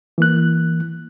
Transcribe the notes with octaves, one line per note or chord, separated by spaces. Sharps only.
E3 A#3 F#6